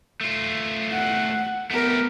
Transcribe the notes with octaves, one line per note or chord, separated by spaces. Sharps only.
A3 F4
F#5
A3 B3 G4 A#4